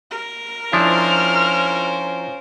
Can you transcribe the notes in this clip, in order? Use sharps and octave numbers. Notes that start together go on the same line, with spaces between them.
A#4
F3 C#4 D4 E4 F4 C5 F6